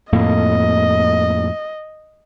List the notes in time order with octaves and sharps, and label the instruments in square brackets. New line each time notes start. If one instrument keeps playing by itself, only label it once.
[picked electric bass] F2 A2 A#3 [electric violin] D#5